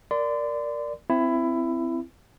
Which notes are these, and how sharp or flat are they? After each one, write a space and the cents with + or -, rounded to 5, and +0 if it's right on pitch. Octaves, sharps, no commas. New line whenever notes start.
A#4 +0 D5 +0 C6 -35
C4 -10 E4 +15